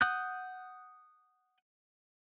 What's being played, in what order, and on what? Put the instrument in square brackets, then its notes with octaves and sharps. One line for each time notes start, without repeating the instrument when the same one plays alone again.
[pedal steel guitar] F#5 D#6 F#6 G6